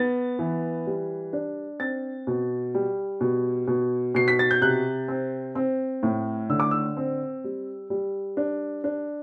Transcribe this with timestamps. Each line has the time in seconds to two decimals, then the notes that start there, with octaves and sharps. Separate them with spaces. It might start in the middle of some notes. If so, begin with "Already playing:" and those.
Already playing: B3 A6
0.39 E3
0.87 G3
1.33 D4
1.80 C4 A6
2.27 B2
2.74 G3
3.21 B2
3.67 B2
4.15 B2 C7
4.28 B6
4.39 A6
4.51 G6
4.61 C3 F#6
5.08 C4
5.55 C4
6.03 A2
6.50 D3 E6
6.60 D6
6.71 E6
6.97 C4
7.44 G3
7.90 G3
8.37 D4
8.84 D4